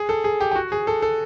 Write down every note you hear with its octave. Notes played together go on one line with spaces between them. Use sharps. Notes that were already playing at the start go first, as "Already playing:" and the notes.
Already playing: G#4
A4
G#4
G4
G4
F#4
G#4
A4
A4